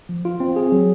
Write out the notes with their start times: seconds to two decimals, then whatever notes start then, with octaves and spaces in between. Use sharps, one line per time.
0.09 F3
0.25 F4
0.40 C4
0.56 G#4
0.72 F#3